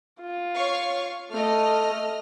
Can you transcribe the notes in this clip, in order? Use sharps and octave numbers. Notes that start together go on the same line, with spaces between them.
F4
C#5 F5 C#6
A3 D#5 F6